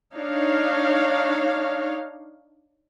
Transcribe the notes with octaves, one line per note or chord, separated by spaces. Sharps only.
D4 D#4 C#5 F5